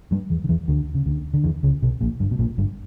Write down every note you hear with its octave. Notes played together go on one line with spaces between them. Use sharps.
G2 G3
E2 E3
D3
E2 E3
D2 D3
C#3
D2 D3
D3
E2 E3
C#2 C#3
B1 B2
A#1 A#2
G1 G2
B2
A#1 A#2
G1 G2